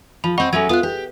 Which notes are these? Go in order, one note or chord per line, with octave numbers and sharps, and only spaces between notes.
F3 B5
C4 D#5 F#5 B5 C#6
F#3 C#4 A4 E5 G#6
B3 F4 D#6 F#6
G4